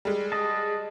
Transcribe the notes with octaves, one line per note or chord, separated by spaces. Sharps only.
G3 G#3
D#5 A5